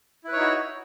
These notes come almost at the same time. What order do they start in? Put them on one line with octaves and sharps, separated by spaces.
E4 B4 C#5 D#4 F#4